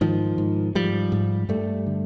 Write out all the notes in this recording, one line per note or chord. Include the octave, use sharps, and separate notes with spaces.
G#2 D#3 F3
G#2
G#2 F3 G3
G#2
G2 G3 A3
D3